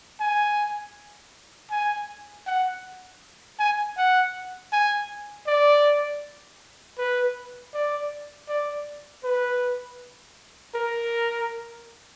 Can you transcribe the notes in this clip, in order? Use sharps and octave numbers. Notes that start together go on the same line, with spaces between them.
G#5
G#5
F#5
G#5
F#5
G#5
D5
B4
D5
D5
B4
A#4